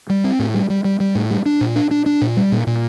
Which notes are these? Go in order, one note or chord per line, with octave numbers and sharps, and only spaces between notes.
G3
C4
A2
G3
G3
G3
G3
A2
G3
D4
A#2
D4
D4
D4
A#2
G3
A#2
A#2